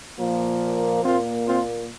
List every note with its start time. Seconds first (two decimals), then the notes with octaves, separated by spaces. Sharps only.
0.19 A#2 F3 A#3
1.04 A#2 A#3 C4 F4
1.47 C4 F4